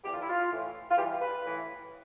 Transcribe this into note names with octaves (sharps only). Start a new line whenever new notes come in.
E2 D3 G4
F4
E4
F4
A2 E3
F4
G2 E3 G4
B4
A2 E3